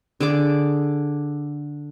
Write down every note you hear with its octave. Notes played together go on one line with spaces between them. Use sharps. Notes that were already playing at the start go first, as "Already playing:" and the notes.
D3 G#4 D5 D6